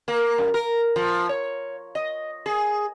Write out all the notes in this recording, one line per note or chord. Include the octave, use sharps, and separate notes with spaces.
A#3
F#2
A#4
F3
C#5
D#5
G#4